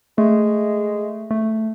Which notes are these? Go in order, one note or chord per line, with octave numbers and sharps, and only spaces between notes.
G#3 A3
A3